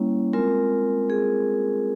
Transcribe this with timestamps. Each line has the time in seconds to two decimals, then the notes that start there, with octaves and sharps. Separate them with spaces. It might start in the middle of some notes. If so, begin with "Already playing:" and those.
Already playing: G3 A#3 C#4 E4 C#5
0.33 G#3 C4 F4 A#4
1.10 G#4